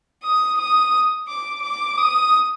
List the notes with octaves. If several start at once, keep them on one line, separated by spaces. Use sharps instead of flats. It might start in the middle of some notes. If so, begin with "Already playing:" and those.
D#6
D#6
D6
D6
D#6